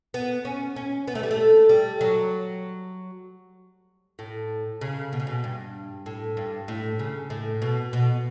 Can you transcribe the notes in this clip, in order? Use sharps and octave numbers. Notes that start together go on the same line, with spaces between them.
B3
C#4
C#4
B3
A3
G3
A3
G3
F#3
A2
C#3
B2
C#3
B2
G2
A2
G2
A2
C#3
A2
B2
B2